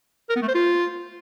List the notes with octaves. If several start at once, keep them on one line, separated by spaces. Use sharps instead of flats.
A#4
B3
A3
C5
F4